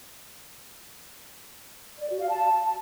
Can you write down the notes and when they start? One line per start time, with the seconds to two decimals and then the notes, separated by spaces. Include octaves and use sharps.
1.99 D5
2.09 F#4
2.19 F5
2.29 A5